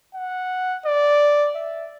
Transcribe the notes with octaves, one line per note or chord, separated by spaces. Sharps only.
F#5
D5
E5